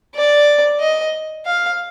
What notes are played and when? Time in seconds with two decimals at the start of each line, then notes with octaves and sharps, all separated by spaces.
0.15 D5
0.80 D#5
1.46 F5